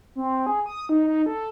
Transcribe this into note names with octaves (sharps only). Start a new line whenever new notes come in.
C4
G#4
D#6
D#4
D#4
A4